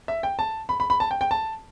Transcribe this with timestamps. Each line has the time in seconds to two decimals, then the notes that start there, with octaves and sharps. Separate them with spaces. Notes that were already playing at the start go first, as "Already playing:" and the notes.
0.08 E5
0.23 G5
0.39 A5
0.69 B5
0.80 B5
0.90 B5
1.00 A5
1.11 G5
1.21 G5
1.31 A5